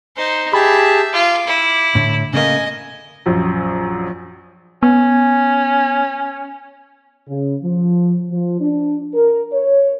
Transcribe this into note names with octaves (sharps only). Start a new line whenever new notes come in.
D#4 C5
G4 G#4 E5 A5 B5
F4 D6
E4
A2 D3
C#3 A3 A#3 D#5 G#5
A#1 F#2
B3 C#4
C#3
F3
F3
D4
A#4
C#5